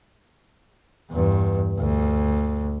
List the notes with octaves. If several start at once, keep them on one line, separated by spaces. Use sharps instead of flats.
E2 G2
D2